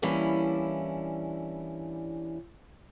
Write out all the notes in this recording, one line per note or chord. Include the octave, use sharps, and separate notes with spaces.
E3 G3 A#3 C#4 D4 E4